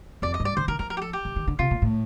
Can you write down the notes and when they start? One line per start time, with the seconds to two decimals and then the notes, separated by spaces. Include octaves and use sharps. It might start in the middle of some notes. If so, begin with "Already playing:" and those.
0.22 F2 D5
0.34 D#5
0.40 G2
0.45 D5
0.57 D3 C5
0.68 D#3 A#4
0.79 F3 A#4
0.90 A#4
0.97 G4
1.02 A4
1.13 G4
1.25 F3
1.36 D#3
1.47 D3
1.59 C3 F4
1.71 A#2
1.82 A2